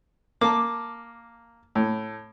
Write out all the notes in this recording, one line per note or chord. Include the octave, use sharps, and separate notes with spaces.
A#3 A5 D6
A2